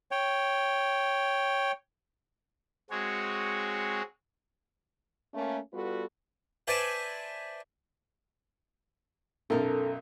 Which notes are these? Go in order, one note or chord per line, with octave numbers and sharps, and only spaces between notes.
C#5 G5
G#3 C4 F#4 G#4 C#5
A3 A#3 C#4
G3 B3 F4 F#4 A4 B4
B4 C5 D5 E5 G#5 A5
B1 F#2 A4 A#4